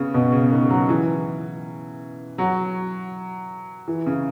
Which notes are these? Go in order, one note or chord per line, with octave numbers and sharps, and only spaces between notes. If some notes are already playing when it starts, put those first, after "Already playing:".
Already playing: C#3 B3
B2
C#3
D#3
F#3
E3
F#3
E3
C#3